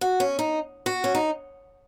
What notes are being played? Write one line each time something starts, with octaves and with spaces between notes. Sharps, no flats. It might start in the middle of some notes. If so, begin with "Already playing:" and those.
F#4
C#4
D#4
F#4
C#4
D#4